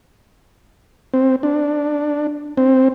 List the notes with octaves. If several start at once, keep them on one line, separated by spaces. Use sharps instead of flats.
C4
D4
C4